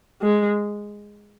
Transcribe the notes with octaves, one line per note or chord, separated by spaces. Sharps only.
G#3